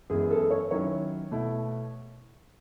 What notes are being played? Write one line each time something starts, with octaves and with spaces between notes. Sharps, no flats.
F#2 E3 G#3 B3 G#4
A4
C#5
D#3 F#3 C#4 E4 C#5
B2 A3 E4